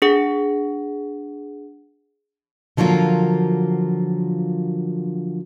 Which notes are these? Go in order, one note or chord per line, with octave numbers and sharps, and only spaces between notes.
D4 G#4 F#5 A#6
D3 F3 F#3 A#3 F4